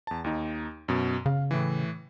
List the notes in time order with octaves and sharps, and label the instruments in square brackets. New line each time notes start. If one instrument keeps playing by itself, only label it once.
[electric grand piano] E2 A5
D#2 D#4
F#2 B2
[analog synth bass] C#3 [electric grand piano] F5
[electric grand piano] A2 E3